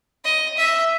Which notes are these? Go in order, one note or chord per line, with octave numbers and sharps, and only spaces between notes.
D#5
E5